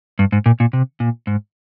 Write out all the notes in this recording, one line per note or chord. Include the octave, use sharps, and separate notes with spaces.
G2
G#2
A#2
A#2
C3
A#2
G#2